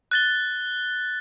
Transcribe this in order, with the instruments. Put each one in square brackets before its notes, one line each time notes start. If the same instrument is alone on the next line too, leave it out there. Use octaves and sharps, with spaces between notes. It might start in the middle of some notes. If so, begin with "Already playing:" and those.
[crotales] F#6 A6 G7